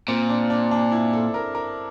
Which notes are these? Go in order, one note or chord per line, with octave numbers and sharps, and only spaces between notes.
A#2 C4
D4
D4
D4
E4
A4
A#4
A#4